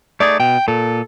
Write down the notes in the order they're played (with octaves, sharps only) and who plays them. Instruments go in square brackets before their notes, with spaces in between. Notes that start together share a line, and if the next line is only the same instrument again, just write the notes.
[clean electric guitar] A3 D#4 G#4 [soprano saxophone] D5
[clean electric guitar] B2 [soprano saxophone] G5
[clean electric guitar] A#2 [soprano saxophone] A4